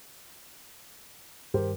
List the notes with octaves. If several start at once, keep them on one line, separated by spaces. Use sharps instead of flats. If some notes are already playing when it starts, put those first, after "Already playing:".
G2 D#3 G4 A#4 C5